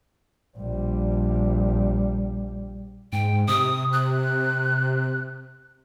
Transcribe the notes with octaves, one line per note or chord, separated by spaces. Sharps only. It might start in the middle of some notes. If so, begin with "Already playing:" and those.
A#1 G3
G#2 G5
C3 D#6
F#6